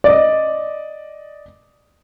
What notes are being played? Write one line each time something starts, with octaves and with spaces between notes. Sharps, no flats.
D5 D#5